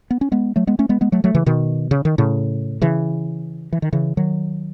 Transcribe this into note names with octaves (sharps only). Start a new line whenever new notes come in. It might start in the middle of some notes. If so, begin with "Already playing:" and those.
B3
C#4
G#3 B3
F#3 A3
G#3 B3
A3 C#4
G#3 B3
G#3 B3
F#3 A3
F#3 A3
C#3 E3
B2 D#3
C#3
D#3
A2 C#3
C#3 E3
E3
D#3
C#3 E3
D#3 F#3